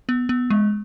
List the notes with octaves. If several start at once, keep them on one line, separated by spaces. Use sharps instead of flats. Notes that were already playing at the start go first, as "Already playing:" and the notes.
B3
B3
G#3